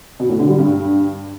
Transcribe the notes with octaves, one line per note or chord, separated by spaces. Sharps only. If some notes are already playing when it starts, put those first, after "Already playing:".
B2
A2
D3
G3
G2